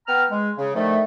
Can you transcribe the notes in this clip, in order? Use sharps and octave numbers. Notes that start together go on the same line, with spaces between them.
B3 G5 A#5 F6
G#3
C#3
D3 D#3 F3 A3